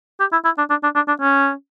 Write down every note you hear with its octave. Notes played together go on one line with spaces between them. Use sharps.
G4
E4
E4
D4
D4
D4
D4
D4
C#4